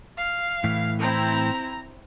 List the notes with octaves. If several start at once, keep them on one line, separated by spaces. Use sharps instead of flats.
F5
A2 E3
C4 E4 A#5